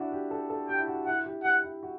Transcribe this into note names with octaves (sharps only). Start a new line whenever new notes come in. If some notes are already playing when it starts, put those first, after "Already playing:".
Already playing: D4 E4 F#4
G4
A4
A4
G4 G5
E4
F#4
E4 F#5
G4
G4 F#5
E4
F#4